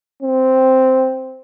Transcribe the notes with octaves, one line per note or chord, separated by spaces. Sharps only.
C4